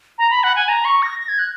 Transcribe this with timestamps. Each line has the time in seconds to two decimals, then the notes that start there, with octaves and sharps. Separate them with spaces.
0.18 A#5
0.31 B5
0.43 F#5
0.56 G#5
0.69 A#5
0.85 C#6
1.02 A#6
1.19 A#6
1.28 G#6
1.39 F#6